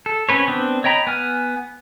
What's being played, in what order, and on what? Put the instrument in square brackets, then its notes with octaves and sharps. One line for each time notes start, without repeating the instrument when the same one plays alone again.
[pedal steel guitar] A4
C4 C#4 B4 C#5
B3 C4 D4
C#5 D#5 G5 A#5 B5
B3 G#5 F6